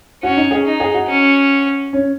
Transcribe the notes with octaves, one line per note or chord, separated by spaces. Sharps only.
C#4 F#4
D#4
G#4
D#4
G#4
F#4
C#4
C#4